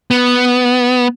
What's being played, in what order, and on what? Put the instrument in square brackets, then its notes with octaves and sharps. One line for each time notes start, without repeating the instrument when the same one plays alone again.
[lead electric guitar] B3